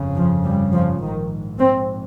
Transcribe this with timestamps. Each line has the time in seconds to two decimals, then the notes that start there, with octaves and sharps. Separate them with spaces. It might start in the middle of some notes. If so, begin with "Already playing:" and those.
Already playing: G1 F2 C#3
0.15 F3
0.44 G3
0.72 F3
1.01 A#1 G#2 D#3
1.58 C4